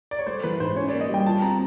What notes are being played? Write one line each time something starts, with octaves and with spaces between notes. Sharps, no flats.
D5
C#5
A3 C5
E3 B4
G#2 C5
C#4 C#5
A#3 D5
D#5
G3 G5
F4 A5
C4 A#5